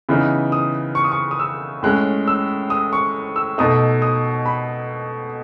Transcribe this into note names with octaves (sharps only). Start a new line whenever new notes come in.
C#3 E3 B3 D#4
D#6
C#6
D#6
C#6
D#6
E6
A2 G#3 C#4 F#6
E6
D#6
C#6
E6
B2 A3 D#4 D#6
D#6
B5